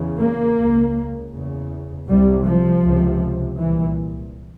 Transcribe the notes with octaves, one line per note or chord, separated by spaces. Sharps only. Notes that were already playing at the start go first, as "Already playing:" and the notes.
Already playing: E2 C#3
A#3
C#2 C#3
E2 C#3
C2 C3 G3
F3
C#2 C3
C2 A#2 E3